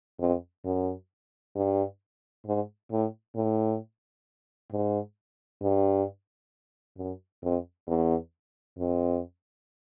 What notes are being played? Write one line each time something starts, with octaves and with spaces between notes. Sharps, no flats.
F2
F#2
G2
G#2
A2
A2
G#2
G2
F#2
F2
E2
F2